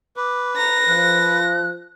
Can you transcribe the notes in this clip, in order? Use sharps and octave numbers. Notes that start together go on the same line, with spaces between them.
B4 D6
A#5 A#6
F3 F#6